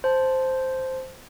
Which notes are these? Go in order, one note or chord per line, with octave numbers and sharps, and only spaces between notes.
C5 A5